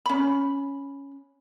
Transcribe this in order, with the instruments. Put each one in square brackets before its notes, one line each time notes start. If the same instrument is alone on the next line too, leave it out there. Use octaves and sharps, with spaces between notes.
[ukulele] C#4 B5